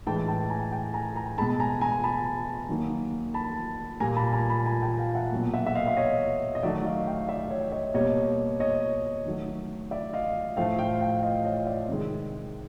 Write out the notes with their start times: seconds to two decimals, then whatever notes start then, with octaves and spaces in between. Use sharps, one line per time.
0.06 A2 E3 G#3 G5 A5
0.28 G5 A5
0.50 G#5 A#5
0.72 G5 A5
0.94 G#5 A#5
1.16 G#5 A#5
1.38 G#3 A5 B5
1.41 B2
1.60 G#5 A#5
1.81 G#5 A#5
2.04 A5 B5
2.69 D#3 F#3 A#3
3.34 A5 B5
4.00 A#2 G3 A#3 G#5 A#5
4.16 A5 B5
4.33 G#5 A#5
4.50 A5 B5
4.66 G#5 A#5
4.82 G5 A5
4.99 F5 G5
5.15 E5 F#5
5.32 B2 F#3 A#3
5.54 E5 F#5
5.66 E5
5.75 D#5 F5
5.87 E5
5.97 C#5 D#5
6.55 D#5
6.63 D#3 F#3 A3 D5 E5
6.85 D#5 F5
7.07 F5 G5
7.29 D5 E5
7.51 C#5 D#5
7.72 C#5 D#5
7.94 B2 G3 A#3 C#5 D#5
8.60 C#5 D#5
9.25 D#3 F#3 A3
9.91 D5 E5
10.14 D#5 F5
10.56 A2 F3 A3 F5 G5
10.79 F5 G5
11.01 F5 G5
11.23 D#5 F5
11.44 C#5 D#5
11.66 D5 E5
11.88 C3 D#3 G#3